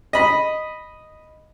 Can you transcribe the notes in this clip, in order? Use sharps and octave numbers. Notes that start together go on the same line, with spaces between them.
D#5 B5